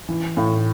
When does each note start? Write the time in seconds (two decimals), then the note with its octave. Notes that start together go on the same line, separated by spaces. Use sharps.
0.09 E3
0.37 A2